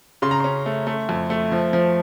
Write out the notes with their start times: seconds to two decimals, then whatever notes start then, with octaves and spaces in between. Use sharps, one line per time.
0.22 C#3 C6
0.31 A#5
0.40 C#4 C6
0.66 A3
0.87 A3
1.09 F2
1.30 A3
1.52 F3
1.73 F3